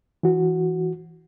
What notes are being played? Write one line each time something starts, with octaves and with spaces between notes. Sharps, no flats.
E3 F#4